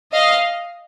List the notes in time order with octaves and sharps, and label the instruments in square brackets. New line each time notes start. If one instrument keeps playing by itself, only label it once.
[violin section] D#5 F5